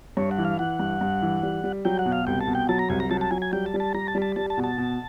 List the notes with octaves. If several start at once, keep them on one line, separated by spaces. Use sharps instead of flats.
G2 C#5
F#5
E3
F5
E3 F#5
G2
G2
E3
G3
G3
F#3 G5
F#5
B2
F5
C2 G5
A5
B2
G5
F#3 A5
A#5
C2 G#5
A#5
F#3 A5
A5
F#3 G#5
G#5
G3 G5
A5
G3
A5
G3 A#5
A5
G3
A5
G3 A5
A5
B2
A5
B2